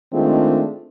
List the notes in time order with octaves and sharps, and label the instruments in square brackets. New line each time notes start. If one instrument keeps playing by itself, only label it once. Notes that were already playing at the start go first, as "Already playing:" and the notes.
[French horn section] D#3 G#3 A3 C4 D4 F4